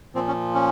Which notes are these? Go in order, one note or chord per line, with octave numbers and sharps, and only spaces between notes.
A#2 F3 C4
C#4
C#4